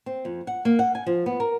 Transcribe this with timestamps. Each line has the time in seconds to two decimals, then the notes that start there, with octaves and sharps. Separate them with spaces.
0.06 C4
0.25 F2
0.47 F#5
0.65 A#3
0.79 F#5
0.95 G#5
1.06 F3
1.26 B3
1.40 A#4